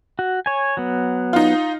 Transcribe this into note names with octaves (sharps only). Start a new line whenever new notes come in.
F#4
C#5 G#5
F#3 B3
D#4 F4